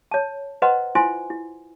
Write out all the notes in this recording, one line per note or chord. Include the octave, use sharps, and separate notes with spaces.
C#5 A5
B4 C5 D#5 F#5 A#5 C6
E4 F4 C5 G#5 C6
E4